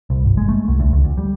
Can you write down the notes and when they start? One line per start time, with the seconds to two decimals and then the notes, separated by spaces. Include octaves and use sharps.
0.10 C2
0.25 G1
0.37 G#3
0.49 A3
0.68 C2
0.80 D2
0.93 C#2
1.04 D2
1.18 G3